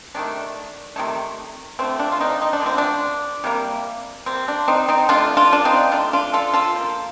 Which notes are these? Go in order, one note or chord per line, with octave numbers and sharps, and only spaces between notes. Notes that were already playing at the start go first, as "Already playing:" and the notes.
C3 D#3 A3 D4
C3 D#3 A3
D3 F3 A3 C4
D4
F4
C4 D#4
D#4
D4
D3 F3 A3 C4
D4
C3 G3 A#3
C3 G3 A#3 C4
D4
C4 D#4
C4 D#4
D3 A3 D4 F4
D4 F4
D4
C4 D#4
D3 A3 D4 F4
D4 F4
F4 A4
F4 A4
D3 F3 A#3